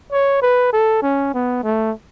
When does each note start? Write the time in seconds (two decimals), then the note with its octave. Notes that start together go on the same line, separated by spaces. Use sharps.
0.12 C#5
0.42 B4
0.73 A4
1.03 C#4
1.34 B3
1.64 A3